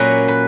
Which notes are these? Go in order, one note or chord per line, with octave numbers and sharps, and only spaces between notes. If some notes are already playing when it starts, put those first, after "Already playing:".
Already playing: A#2 F#3 A#3 C#4 B4
B4